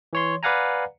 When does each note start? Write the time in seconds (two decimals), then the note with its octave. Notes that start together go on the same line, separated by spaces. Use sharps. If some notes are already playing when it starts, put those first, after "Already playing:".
0.13 E3 C#5 C6
0.43 B4 D5 F5 F#5 G#5 A#5